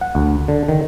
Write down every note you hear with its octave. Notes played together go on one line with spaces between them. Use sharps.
F#5
D2
D3
D#3